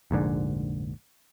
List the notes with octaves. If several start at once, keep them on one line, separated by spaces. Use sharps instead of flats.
F1 A#1 G#2 D3